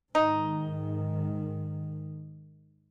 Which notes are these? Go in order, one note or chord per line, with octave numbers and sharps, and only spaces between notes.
G#2 D#3 D#4